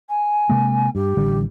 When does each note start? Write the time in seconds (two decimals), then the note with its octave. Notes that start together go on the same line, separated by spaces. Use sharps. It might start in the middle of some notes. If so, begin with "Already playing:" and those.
0.09 G#5
0.49 C3 G#3 A#3
0.95 G2 G4
1.17 A1 D3 G3